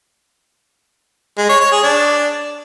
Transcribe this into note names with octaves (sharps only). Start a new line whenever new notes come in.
G#3
C#5
C#5
G#4
D4